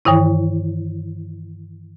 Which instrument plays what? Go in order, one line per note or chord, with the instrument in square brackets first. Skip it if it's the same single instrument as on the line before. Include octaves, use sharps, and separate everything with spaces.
[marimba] G2 D#3 E3 E4